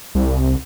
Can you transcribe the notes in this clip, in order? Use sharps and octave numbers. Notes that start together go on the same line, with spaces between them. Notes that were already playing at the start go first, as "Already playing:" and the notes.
C2